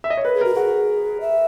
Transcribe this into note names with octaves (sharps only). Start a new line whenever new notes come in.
E5
D#5
C#5
A#4 B4
G#4
F#4 A#4
F#4 G#4
E5